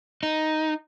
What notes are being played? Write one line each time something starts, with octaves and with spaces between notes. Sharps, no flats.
D#4